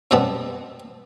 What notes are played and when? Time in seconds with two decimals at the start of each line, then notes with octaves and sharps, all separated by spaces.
0.11 F#2 B2 G3 B3 C4 A5